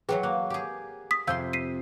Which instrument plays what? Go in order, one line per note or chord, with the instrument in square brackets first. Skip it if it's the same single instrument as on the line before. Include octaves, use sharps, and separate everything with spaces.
[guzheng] E3 F#3 F#4 [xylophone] G#4 B4 G5
[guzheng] A#3 [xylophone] F#6
[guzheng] G4 G#4
[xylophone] D#6 B6
[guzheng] F2 C3 C6 [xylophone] F5 E6 G6
[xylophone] B6 C7 D#7